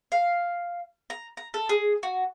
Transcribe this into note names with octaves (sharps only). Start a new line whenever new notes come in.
F5
A#5
A#5
A4
G#4
F#4